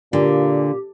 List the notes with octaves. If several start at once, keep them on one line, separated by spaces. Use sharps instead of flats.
A#2 D3 G4